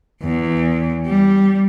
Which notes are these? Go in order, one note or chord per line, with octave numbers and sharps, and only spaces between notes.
E2
G3